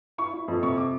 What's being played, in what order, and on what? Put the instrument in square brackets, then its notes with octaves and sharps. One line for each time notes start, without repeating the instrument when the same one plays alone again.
[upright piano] E4 C#6
E4
F2
C3 C#6
D6